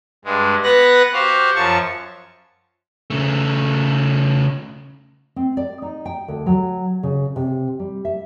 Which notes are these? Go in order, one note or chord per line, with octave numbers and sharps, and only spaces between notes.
G2 G#3
B3 B4 F#5 F#6 A#6
F#4 G4 C5 F5
F#2 F3 A5 C#6
C#3 A3
C4
D5
D#4
G5
D2
F#3
C#3
C3
G3
E5